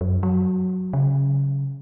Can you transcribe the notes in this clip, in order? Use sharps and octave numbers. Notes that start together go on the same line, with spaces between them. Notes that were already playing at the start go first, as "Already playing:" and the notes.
F#2
F#3
C#3